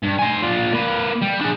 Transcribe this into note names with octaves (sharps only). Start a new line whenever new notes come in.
G2
C5 G#5
D4 F4
A#3 B4
G3
D4 G#4